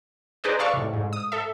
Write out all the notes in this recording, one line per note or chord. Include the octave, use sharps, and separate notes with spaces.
D#4 G#4 B4 C5 D5 D#5
A4 B4 D5 F5 C#6 E6
A2 C3
G#2
D#6
A4 E5